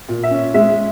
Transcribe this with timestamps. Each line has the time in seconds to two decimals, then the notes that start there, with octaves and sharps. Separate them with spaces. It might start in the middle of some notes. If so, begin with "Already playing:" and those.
0.09 A#2
0.23 E5
0.31 C#4
0.54 G#3 E5